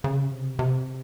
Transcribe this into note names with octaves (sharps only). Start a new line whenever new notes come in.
C#3
C3
C3